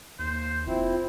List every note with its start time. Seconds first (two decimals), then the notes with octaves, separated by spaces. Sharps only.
0.19 D#2 A#3 C5
0.67 F1 C4 E4 F4